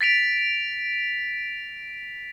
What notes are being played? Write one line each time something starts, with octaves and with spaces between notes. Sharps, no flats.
A6 B6 D7 F7